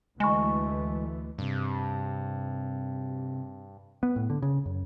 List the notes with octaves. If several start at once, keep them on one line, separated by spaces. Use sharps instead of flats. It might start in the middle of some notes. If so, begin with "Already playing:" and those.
D2 E3 G#3 A3 G#5 C#6
G2 C3
B3
A2
D3
C#3
F#2